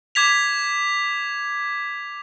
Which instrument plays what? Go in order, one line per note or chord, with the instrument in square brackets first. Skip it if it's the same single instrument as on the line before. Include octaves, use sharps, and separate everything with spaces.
[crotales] D6 G#6 B6 F7